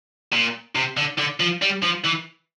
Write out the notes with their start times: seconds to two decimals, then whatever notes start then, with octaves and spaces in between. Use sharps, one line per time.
0.32 A#2
0.75 C3
0.97 D3
1.18 D3
1.40 F3
1.62 G3
1.83 F3
2.05 E3